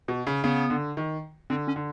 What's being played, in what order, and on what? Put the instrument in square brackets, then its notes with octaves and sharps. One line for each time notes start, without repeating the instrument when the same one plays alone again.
[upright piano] B2
C#3
[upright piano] C#3 [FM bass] B3
[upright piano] D3
D#3
[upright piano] D3 [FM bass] C4
[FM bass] C#4
[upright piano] D3